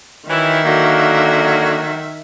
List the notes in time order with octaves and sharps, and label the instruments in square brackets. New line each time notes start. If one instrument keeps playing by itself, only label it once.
[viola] D#3 E5 [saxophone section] E3 F#3 E4
[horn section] D3 A#3 [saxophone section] F#3 F#4